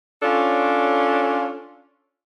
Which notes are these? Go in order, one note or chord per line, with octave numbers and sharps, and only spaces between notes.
C#4 D4 F4 A4 C#5